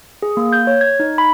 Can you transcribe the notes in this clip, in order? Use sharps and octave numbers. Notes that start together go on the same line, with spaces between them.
G#4
A#3
G6
C#5
G#6
D#4
B5